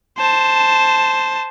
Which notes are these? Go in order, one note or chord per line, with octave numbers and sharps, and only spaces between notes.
C5 A5